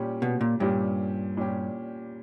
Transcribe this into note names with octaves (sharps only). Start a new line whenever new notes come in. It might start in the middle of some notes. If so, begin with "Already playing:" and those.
Already playing: A#2 G3 C#4 G4
B2
A#2
G2 A#2 G3 C#4 G4
A#2 G3 C#4 G4